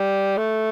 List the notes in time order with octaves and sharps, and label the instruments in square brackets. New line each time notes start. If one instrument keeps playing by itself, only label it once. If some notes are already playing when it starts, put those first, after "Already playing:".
Already playing: [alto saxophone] G3
A3